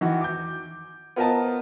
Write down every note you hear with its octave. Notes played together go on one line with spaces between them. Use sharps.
D#3 E3 F#4
D6 G6
B3 F4 A#4 C5 D#5 A5